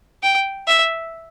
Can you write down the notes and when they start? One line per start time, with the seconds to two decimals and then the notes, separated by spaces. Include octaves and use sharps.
0.23 G5
0.67 E5